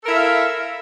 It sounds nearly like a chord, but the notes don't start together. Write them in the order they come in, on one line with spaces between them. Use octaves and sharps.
A4 A#4 E4 E5 F5